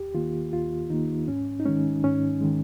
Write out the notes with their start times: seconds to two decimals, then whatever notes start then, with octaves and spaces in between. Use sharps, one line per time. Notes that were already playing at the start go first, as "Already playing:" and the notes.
Already playing: D#2 G4
0.14 D#3 A#3 F4
0.52 D#2 F4
0.90 D#3 A#3 D#4
1.28 G#2 C#4
1.60 D#4
1.65 D#3 G#3 C#4
2.03 G#2 C#4
2.41 D#3 G#3